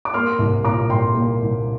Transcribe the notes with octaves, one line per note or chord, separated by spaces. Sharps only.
D6
A#3 C6 F6
C2
A#2 A#5 D6
C2 G5 C6
A#3
C2